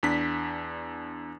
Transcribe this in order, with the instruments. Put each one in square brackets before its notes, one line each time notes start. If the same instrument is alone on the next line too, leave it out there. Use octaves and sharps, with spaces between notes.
[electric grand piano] E2 D4 B6